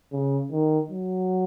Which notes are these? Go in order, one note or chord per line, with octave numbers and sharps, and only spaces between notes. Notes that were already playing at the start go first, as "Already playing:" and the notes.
C#3
D#3
F#3